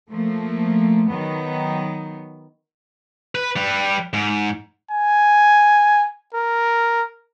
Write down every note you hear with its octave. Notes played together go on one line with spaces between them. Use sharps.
F3 A3 A#3
D#3 F#3 B3
B4
G3 B4
G#2
G#5
A#4